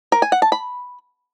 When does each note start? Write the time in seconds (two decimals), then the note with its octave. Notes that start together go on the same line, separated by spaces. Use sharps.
0.12 A#4
0.22 G#5
0.32 F#5
0.42 A5
0.52 B5